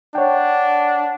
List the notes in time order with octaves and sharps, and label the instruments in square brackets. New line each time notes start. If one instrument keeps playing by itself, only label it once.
[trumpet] D4 [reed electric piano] C#5 G5 [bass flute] F#5